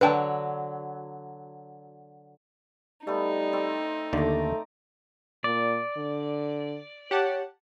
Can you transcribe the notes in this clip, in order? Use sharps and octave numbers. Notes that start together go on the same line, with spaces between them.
D3 F#3 B4 G5 A5
G3 A3 B3 D#4
C4 D5
D#2 D3 A3 D5 A#5 D6
A#2 D5
D3
G4 C#5 F#5 A5